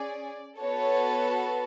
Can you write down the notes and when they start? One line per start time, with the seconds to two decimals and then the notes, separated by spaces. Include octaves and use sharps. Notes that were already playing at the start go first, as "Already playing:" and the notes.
Already playing: C#4 G#4 D5
0.59 B3 F#4 A4 C#5